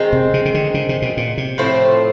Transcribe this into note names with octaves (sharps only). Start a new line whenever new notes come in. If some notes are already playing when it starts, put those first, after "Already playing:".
Already playing: D#3 G#3 C4
C3
C#3
C#3
D3
C#3
C3
B2
A#2
C3
A2 F3 A3 C4